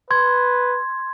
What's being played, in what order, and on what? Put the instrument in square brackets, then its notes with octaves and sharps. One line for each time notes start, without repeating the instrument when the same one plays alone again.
[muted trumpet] B4 [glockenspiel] C6 G#6